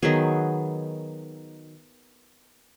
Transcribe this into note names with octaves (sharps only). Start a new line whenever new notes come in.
D#3 F#3 B3 G#4